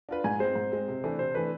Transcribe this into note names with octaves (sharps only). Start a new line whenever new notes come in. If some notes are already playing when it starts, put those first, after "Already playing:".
D4 F4 B4
G#2 G#5
G#3 C4 C5
G#2
G#3 C4
C3
E3 A3 D4
C3 C5
E3 A3 D4 B4